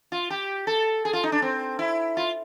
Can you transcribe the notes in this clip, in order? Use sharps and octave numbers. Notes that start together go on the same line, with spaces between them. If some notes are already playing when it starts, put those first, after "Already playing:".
F4
G4
A4
G#4
F4
D#4
D4
C4
E4
F4